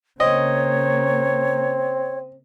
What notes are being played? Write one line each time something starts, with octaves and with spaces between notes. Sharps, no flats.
C#3 A#3 C4 C#5 D#5